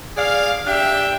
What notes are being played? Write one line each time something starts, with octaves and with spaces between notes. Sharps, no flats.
G#4 D5 F5
D4 G4 E5 G5